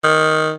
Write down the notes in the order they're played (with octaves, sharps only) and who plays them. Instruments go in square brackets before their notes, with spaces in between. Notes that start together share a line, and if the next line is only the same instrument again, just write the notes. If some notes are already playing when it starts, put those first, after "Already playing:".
[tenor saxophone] D#3